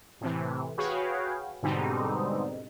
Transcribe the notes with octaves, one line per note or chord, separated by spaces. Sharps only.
A2 C3 E3
F#4 G#4 B4 C#5 F5 G5
G#2 B2 D3 G3 C4 D#4